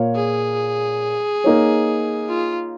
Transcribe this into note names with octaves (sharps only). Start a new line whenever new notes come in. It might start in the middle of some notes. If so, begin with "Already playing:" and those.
Already playing: A#2 A#3 F4 C#5 F5
G#4
A#3 D#4 C#5
F4